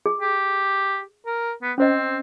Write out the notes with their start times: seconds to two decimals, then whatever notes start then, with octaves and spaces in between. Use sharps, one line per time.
0.06 G#4
0.21 G4
1.26 A#4
1.62 B3
1.78 C4 C#4 C5 D#5